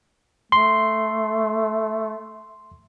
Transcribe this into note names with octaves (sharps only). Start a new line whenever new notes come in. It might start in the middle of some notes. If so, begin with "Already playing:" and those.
A3 C6